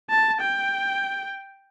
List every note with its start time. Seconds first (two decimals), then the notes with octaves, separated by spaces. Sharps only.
0.10 A5
0.42 G5